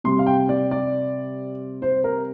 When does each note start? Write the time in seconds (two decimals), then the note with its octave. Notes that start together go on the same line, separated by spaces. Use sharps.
0.04 C3 G3 C6
0.19 F5
0.26 G5
0.49 D5
0.71 D5
1.82 C5
2.04 A#4